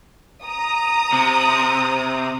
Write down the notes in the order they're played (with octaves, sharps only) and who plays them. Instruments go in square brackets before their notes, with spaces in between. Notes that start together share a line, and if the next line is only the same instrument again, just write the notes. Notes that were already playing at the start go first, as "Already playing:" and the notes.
[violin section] A#5 D#6
[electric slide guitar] C3